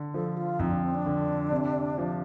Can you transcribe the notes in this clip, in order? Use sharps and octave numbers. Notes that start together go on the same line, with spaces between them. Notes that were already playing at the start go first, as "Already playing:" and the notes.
Already playing: D3
F3 A4
F4
F2 D#4
D4
C4
D4
D3
C3
F3